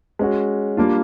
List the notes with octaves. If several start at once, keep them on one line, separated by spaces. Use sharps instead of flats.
G#3 C#4 F#4
G3 A#3 D4 F4